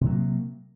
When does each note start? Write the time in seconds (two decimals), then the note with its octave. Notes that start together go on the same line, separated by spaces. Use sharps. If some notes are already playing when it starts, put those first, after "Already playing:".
0.01 C3
0.06 F#3
0.11 A#3